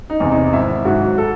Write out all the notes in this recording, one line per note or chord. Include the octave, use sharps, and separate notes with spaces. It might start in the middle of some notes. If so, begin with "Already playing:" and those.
D#4
E2 C3
D#4
G#1 E4
G#2 F#3 F#4
A4